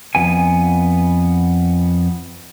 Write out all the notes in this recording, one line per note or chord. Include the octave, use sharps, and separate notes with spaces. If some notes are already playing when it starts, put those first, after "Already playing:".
F2 B3 G#5